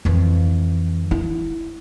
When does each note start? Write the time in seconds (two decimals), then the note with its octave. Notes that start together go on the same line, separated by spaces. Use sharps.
0.05 F2 E3
1.11 E4